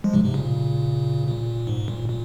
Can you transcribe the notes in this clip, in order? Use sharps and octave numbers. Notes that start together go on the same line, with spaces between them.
F3 G#3
G#2 C3
G#2 C3
A#2 C#3
A#2
G#2
A#2
A#2